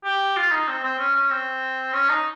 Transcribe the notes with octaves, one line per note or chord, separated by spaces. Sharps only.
G4
F4
D#4
C4
C4
C#4
C#4
C4
C#4
D#4